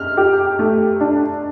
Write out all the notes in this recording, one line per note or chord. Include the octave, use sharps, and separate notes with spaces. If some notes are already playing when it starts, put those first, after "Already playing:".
Already playing: F6
G4
A3
D4